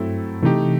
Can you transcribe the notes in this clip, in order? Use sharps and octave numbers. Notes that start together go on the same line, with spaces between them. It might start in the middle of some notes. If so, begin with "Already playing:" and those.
Already playing: G2 F#3 A3 C4 E4 A4
C3 E3 A3 D#4 G4